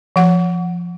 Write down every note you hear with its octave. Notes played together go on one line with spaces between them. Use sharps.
F3 F#5